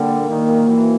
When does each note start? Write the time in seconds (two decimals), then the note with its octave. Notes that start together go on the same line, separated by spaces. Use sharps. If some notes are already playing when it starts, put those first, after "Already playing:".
Already playing: D3 G3 A#3
0.09 A#2
0.28 D#3 A#3
0.48 A#2
0.67 E3 F#3